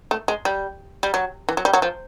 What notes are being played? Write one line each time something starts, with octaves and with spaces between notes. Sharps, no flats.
A3
G#3
G3
G3
F#3
E3
F#3
G3
F#3
F3